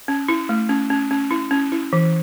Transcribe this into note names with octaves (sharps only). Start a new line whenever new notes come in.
C#4
E4
A3
C#4
C#4
C#4
E4
C#4
E4
E3